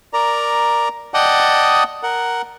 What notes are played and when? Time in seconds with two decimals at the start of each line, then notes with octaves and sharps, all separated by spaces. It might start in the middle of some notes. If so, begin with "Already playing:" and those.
0.13 A#4 D5 A#5
1.14 D5 D#5 F#5 G5 A5 D#6
2.03 A#4 F#5